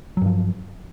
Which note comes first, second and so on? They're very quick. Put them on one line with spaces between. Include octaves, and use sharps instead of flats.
F#3 G2 F3